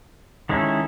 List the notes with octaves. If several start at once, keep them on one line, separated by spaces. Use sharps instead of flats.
D#3 G#3 C#4 E4 A4